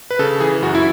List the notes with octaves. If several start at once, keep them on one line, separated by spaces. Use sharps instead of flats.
B4
C#3 A4
E3 G#4
F#2 F#4
E4